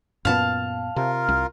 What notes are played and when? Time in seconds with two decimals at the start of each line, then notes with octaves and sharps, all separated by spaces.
0.25 F#2 A#2 B3 F5 A5
0.96 C3 F4 A#4
1.29 C2